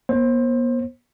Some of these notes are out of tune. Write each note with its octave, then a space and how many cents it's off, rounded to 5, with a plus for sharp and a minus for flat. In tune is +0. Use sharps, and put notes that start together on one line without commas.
B3 -45 C5 +30